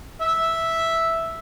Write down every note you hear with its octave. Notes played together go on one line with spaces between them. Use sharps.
E5